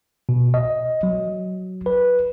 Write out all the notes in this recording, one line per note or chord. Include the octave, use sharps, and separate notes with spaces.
B2
D#5
F#3
B4